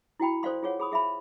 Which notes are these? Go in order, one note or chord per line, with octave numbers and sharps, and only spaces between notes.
E4 F#4 G5 B5
A4 C5 D5 F5 C6
F4 G#4 C#5 F#5
G#4 B5 D#6
G#4 E5 F5 B5